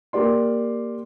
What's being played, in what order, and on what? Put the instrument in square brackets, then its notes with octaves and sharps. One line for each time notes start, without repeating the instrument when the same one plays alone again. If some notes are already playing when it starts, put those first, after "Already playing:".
[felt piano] A#3 G4 D5 C6